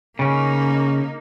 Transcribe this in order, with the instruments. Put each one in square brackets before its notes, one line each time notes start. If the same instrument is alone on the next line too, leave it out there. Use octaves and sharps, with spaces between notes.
[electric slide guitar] C#3 C#4 [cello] A#3 D#4